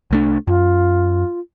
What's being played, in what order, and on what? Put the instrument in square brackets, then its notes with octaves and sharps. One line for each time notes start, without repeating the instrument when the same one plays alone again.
[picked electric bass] C2 A3 D4
[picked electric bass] F#2 [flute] F4